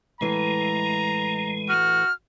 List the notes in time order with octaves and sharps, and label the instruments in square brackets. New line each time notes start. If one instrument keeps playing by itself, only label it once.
[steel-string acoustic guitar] A2 E3 A4 [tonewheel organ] G#3 [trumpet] A#5
[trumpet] F#4 [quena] F6